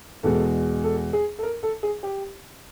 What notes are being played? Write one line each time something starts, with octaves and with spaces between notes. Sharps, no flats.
E2 B2 G#3 A4
A4
G#4
A4
A#4
A4
G#4
G4